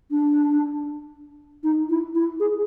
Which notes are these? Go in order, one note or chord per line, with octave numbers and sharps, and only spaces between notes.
D4
D#4
E4
E4
G#4